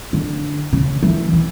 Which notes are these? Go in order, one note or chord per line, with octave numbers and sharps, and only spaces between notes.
D3
C#3
E3
E3